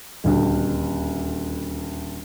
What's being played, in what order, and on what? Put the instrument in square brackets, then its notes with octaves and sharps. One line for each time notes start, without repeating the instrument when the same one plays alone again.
[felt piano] D#1 D2